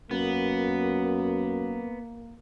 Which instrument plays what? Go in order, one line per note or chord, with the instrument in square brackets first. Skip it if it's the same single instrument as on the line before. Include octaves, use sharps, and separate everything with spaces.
[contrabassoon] F#2 [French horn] A#3 [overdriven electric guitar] B3